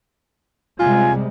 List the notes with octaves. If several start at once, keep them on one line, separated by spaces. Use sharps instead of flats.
C3 G3 G#3 F4 G#5